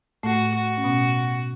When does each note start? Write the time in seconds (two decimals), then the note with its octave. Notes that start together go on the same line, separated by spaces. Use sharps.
0.23 A2 A3 F#4
0.54 F#4
0.78 C#4
0.84 B2 B3